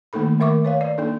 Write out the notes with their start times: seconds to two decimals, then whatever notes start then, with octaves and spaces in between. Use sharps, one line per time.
0.13 D#3 A3 A#3 D#4 A4 B5
0.39 D#3 A3 A#4 E5 C#6 D6
0.65 B4 C#5 F5
0.81 D5
0.98 A#3 D4 D#4 A4